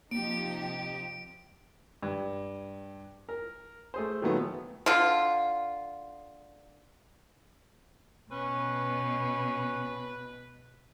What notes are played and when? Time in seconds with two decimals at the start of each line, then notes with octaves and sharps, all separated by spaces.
0.11 C3 F3 A#3 D#4 G4 D7
2.03 G2
3.29 A#4
3.94 A3 G#4 C5
4.22 A#2 D#3 F3 F#3 A3 B3
4.86 D3 F4
8.32 B2 C#4 B4